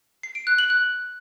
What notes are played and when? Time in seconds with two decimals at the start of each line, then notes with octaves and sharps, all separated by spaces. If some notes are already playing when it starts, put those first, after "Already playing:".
0.23 C7
0.35 D7
0.47 F#6
0.58 F#7
0.70 F#6